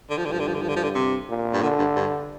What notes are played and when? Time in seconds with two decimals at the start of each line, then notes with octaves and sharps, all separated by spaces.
0.10 D3
0.18 F3
0.25 D3
0.28 G2 F3
0.40 D3
0.48 F3
0.54 D3
0.62 F3
0.68 D3
0.76 F3
0.84 D3
0.95 C3
1.29 A#2
1.53 G2
1.62 A#2 D3
1.78 G2
1.96 G2